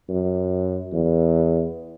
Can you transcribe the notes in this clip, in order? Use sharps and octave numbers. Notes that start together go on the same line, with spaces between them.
F#2
E2